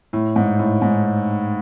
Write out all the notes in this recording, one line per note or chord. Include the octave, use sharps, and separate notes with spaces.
A2
G#2
A2
G#2